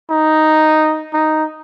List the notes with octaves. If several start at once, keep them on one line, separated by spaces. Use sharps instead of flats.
D#4
D#4